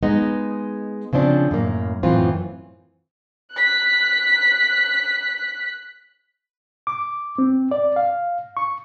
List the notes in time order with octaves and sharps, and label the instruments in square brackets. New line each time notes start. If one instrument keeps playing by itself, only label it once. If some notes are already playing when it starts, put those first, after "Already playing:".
[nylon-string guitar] G#3 B3 D#4
C#3 F3 C4 D4
F#2 A2 A#3
F#2 A2 E3 C4 F4
[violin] F#6 B6
[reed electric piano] D6
C4
D5
F5
C#6